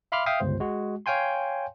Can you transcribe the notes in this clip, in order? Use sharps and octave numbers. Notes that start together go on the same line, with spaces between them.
E5 F5 B5 C6 D6 F6
E5 F5 G5 D#6
G1 C#2 C5
G#3 F#4
C#5 F5 G5 G#5 C6